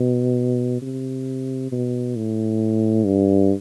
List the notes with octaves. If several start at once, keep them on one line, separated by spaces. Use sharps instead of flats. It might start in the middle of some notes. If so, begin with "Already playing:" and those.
Already playing: B2
C3
B2
A2
G2